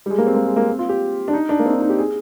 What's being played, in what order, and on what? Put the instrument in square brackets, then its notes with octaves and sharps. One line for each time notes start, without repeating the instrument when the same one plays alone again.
[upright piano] G3
G#3
A#3
C4
A#3
G#3
A#3
C4
F4
G4
D4
D#4
D4
A#3
C4
D4
D#4
G4
G#4